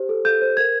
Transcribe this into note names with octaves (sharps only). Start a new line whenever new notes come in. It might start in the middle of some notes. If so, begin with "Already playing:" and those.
Already playing: G4 C5
A4
A4 G6
C5
A#4 G#6